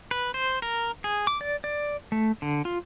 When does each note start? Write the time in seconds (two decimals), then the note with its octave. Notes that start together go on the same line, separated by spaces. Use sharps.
0.11 B4
0.34 C5
0.62 A#4
1.04 G#4
1.27 D6
1.41 D5
1.64 D5
2.12 A3
2.42 D3
2.65 F4